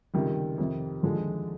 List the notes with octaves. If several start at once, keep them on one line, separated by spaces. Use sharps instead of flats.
C#2 C3 D#3 G3
F2 C3 D#3
D#2 D3 F3 G#3